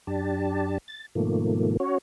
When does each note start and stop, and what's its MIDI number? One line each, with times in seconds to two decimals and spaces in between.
0.07 0.78 42
0.07 0.78 62
0.07 0.78 67
0.07 0.78 81
0.88 1.06 93
1.15 1.77 44
1.15 1.77 47
1.15 1.77 51
1.15 1.77 53
1.15 1.77 57
1.15 1.77 58
1.80 1.98 61
1.80 1.98 66
1.80 1.98 73